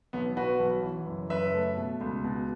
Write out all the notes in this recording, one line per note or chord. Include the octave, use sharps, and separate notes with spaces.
B1 B3
B2 F#4 B4
B1
E3
F#1
F#1 B4 E5
A3
B2
C#2
B2